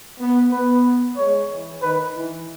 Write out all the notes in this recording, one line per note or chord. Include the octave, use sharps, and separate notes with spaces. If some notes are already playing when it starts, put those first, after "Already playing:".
B3
B3 B4
G#3 C#5
E3
D#3 B4
E3